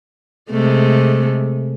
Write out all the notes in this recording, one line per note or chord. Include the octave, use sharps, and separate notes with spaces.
C3 G#3 A3